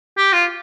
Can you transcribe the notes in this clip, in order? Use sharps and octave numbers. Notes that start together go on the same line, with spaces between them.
G4
F4